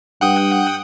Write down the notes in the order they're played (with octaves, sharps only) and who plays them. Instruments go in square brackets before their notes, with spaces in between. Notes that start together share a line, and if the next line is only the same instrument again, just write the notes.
[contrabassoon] G2 [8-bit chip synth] F#5 G5 D#6